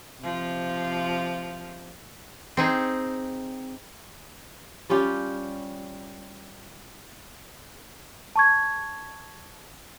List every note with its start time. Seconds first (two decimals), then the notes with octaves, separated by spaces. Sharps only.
0.19 C3 F3
2.57 C4 D#4 G#4
4.90 G3 C#4 F4 G4
8.36 A5 C#6 G#6